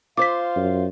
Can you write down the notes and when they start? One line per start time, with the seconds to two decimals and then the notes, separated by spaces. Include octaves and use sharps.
0.17 F4 C5 F5 D6 B6
0.56 F#2